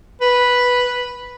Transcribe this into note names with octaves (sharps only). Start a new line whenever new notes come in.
B4